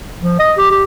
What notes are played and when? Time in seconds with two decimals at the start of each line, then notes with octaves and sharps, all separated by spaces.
0.21 F3
0.39 D#5
0.58 G4
0.71 G4